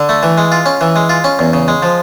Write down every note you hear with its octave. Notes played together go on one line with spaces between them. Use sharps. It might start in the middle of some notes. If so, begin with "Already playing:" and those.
Already playing: D3
A3
E3
G#3
F4
C#4
E3
G#3
F4
C#4
E2
C#3
G#3
F3